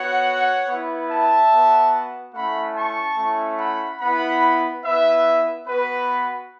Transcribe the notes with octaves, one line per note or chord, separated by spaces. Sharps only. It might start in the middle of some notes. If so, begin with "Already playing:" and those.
Already playing: B3 F#4 C#5 F#5
B3 E4
E5 A5
B3 F#4
A3 C#4 E4 F#5 B5
A5 C#6
A3 C#4 E4
F#5 B5
B3 E4 F#5 B5
B3 E4 B4 E5
B3 F#4 B4